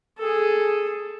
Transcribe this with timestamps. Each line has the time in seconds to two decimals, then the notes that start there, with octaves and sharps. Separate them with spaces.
0.19 G#4 A4